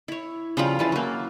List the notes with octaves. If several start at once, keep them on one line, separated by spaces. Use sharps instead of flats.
E4 C#5
C#3 F3 G3 F4
C#3 E3 A5
F#3 A#3